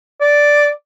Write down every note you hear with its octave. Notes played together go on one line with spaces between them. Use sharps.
D5